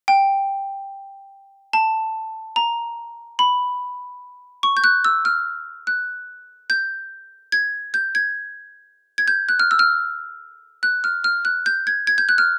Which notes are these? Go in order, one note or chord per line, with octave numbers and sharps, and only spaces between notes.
G5
A5
A#5
B5
C#6
G6
F#6
E6
F6
F#6
G6
G#6
G6
G#6
G#6
G6
F#6
F6
E6
F6
F#6
F6
F6
F#6
G6
G#6
G#6
G6
F#6
F6